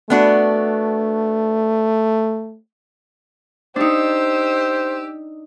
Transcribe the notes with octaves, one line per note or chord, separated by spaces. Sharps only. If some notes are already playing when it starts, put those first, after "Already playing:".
A3 B3 D4 F#4
D4 D#4 G4 C5 E6